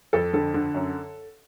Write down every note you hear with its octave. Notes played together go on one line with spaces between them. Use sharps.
F2 A4
D3 A4
D3
F#2